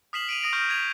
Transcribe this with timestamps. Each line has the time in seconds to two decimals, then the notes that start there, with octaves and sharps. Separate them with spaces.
0.13 D#6 F6 B6 C7 E7 F#7
0.29 D7 D#7 F7
0.41 D#6 A#6 D7 D#7
0.53 C#6 D#6 F6 G6 A#6 D7
0.70 G#6 B6 D#7 F7